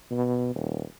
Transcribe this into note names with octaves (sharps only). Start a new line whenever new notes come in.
B2
D#1